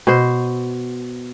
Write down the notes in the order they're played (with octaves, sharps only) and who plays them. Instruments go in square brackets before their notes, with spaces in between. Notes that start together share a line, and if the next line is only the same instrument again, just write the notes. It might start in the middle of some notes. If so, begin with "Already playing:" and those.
[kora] B2 C5